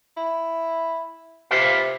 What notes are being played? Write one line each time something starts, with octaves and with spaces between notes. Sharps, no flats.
E4
C3 F4 B4 F5